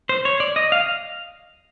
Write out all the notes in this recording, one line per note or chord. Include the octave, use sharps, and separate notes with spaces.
C5
C#5
D5
D#5
F5